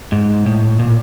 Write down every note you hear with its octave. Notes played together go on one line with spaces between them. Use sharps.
G#2
A2
A#2